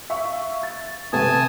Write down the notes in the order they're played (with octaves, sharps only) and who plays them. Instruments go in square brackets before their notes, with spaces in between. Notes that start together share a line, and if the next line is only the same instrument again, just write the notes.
[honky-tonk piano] E5 F5 C#6
A6
[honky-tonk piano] C3 A3 B3 [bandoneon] G#5 A5 D#6